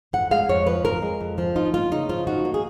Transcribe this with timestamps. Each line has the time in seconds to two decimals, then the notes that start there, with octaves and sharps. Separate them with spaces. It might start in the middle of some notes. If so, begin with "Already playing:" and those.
0.13 F2 F#5
0.31 G#3 F5
0.49 F2 C#5
0.67 F3 B4
0.85 F2 A#4
1.02 G#3
1.21 F2
1.38 F3
1.56 D#4 F4
1.73 A#3 F4
1.91 C#3 D#4
2.09 F3 F4
2.27 D#4 F#4
2.45 A#3
2.54 G#4